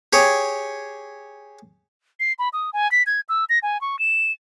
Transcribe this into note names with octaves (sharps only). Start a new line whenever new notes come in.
G4 G#4 C#5
C7
B5
D#6
G#5
B6
G#6
E6
A#6
G#5
C#6
E7